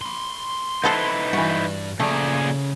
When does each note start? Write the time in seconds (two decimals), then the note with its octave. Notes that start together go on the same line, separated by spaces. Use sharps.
0.02 B5 C6
0.84 B3 D#4 E4 A4 B4 C5
1.33 G2 E3 F#4
2.00 A#2 C#3 A3 G#4 D5 A#5